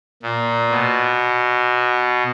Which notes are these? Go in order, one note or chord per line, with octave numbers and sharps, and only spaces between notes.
A#2
B2